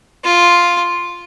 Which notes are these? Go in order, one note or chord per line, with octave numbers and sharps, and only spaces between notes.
F4